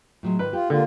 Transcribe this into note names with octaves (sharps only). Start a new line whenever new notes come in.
A2 F#3 G#3
G#2 D#3 B4
F4 G4
D3 A#3 F4